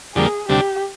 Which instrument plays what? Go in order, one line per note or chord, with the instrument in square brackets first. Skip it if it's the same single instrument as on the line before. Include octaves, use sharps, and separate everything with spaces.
[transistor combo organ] F2 D3 G3 A#3 [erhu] G#4
[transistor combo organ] D2 C3 G3 D4 [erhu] G4